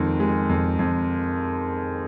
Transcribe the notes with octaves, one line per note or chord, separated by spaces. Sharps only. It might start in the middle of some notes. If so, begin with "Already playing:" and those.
Already playing: F2 D#3 G#3
G#3
F2
F2